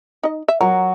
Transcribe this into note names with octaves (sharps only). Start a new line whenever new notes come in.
D#4 D#5
E5
F#3 A#4